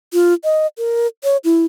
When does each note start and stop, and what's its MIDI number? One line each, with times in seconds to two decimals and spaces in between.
0.13 0.34 65
0.44 0.67 75
0.78 1.07 70
1.24 1.37 73
1.44 1.65 64